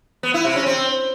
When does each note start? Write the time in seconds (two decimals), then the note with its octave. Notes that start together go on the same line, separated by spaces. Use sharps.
0.23 B3
0.34 E4
0.45 C3
0.56 C#4
0.66 C4